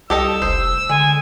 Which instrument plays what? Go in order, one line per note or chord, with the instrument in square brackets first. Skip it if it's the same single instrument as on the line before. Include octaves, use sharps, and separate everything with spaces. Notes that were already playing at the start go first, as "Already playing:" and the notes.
[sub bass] C2 [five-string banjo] G4 A4 D#5 [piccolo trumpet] E6
[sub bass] F1 [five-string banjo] C5
[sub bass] D3 [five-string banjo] G#3 [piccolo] G#5